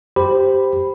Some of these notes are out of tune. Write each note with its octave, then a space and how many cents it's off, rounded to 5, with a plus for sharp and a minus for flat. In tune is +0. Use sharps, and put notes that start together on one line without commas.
G4 +0 C5 -10 B5 +0